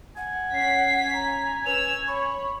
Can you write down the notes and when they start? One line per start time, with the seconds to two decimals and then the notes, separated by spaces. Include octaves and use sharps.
0.16 F#5 G#5
0.55 C#4 B6 C7
1.14 A#5
1.66 C#4 B4 E6 F7
2.07 C#5 B5 C#6